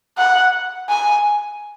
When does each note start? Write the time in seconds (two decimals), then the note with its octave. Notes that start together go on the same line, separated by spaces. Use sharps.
0.18 F#5
0.89 G#5